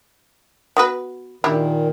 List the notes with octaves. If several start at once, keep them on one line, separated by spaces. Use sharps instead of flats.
B3 F#4 B4
A#2 D#3 D4 E4 G4